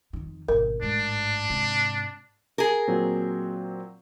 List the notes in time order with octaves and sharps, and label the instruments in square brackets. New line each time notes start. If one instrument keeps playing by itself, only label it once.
[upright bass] F2 D#3
[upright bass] G#1 B2 [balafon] A#4
[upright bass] A1 G#2 [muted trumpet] D4
[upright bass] G#2 C3
[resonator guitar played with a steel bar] G#4 A#4
[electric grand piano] A#2 F#3 C4